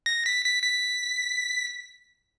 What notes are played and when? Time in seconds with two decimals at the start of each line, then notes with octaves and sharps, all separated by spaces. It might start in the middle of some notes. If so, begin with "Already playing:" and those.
0.06 A#6
0.26 B6
0.45 B6
0.63 B6